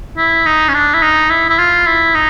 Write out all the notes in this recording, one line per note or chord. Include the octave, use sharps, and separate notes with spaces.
E4
D#4
C#4
D4
E4
D#4
E4
E4
F4
E4
D#4